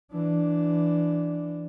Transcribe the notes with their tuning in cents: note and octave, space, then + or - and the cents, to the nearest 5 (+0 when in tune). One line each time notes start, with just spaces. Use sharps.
E3 +20 D4 +0